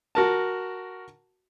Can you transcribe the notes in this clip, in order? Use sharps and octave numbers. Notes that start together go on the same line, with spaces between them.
F#4 A#4 A5